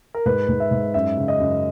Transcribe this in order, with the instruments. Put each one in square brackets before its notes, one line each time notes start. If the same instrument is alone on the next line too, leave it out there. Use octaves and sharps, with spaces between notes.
[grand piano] A#4
G#2 B4
G#2
E5
G#2
F#2 E5
C#3
D#5
F#2